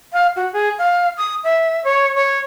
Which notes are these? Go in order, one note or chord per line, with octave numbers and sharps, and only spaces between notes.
F5
F#4
G#4
F5
D#6
E5
C#5
C#5